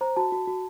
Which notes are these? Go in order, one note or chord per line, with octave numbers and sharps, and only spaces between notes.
C5 A#5
F#4 A5
F#4
F#4